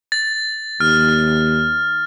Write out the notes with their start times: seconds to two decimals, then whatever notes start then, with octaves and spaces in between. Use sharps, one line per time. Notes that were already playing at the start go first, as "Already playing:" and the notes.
0.12 A6
0.80 D#2 F6